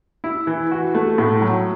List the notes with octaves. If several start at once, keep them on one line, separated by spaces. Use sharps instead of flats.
E4
E3
F#4
A3
A2
F#3